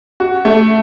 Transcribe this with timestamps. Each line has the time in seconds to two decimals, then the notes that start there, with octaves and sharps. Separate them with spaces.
0.20 F#4
0.45 A3